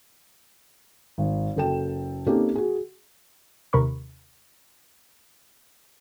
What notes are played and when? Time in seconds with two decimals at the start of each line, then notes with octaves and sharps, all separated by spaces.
1.18 G#1
1.56 F#1 F#4 A4 G5 E7
2.27 A#3 C4 C#4 D#4 G4 A4
2.56 F#4 G#4
3.73 D#2 C3 A#4 B5 C#6